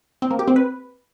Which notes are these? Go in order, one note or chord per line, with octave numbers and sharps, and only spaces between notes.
C4
A#3
G4
C4
B4